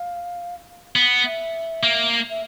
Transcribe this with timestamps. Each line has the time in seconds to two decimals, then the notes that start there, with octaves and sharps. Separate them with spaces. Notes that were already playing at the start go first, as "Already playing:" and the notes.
Already playing: F5
0.96 B3
1.25 E5
1.83 A#3
2.30 E5